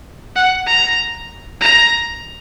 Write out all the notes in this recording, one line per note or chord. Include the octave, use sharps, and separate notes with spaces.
F#5
A#5
A#5